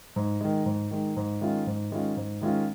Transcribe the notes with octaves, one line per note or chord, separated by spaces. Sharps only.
G#2
D#3 G#3
G#2
D#3 G#3
G#2
D#3 G#3 C#4 F4
G#2
D#3 G#3 C#4 F4
G#2
D#3 G#3 C#4 F4